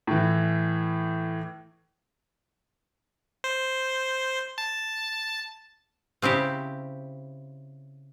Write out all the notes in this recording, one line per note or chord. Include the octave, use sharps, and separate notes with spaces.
A2 E3
C5
A5
C#3 C4 E4 G4